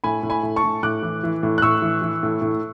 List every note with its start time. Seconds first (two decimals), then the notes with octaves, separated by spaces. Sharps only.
0.04 A2 G#5 B5
0.23 A2
0.30 G#5 B5
0.43 A2
0.56 A5 C#6
0.64 A2
0.83 A2 D6 F#6
1.02 E3
1.24 E3
1.43 A2
1.58 F#6
1.62 A2 C#6 E6
1.82 E3
2.02 E3
2.23 A2
2.42 A2